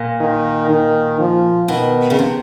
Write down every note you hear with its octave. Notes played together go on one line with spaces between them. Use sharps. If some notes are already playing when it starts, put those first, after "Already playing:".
Already playing: A#2
D#3
D#3
F3
B2 D#3
C#3
C3